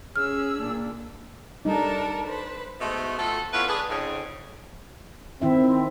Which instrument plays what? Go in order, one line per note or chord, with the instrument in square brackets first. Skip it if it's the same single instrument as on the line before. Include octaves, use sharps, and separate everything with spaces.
[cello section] C#4 [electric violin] G#4 E6 [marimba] F6
[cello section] A#2 D4
[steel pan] G3 D#4 [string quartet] D4 A4 A#4
[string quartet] B4 C5
[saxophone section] G#2 B2 G#3 A3
F3 A3 F4 F#4 A4
A3 B3 C#4 E4 F4 B4
D4 G#4 B4
F2 G#2 C#3
[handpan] D#3 E4 E5 [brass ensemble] C4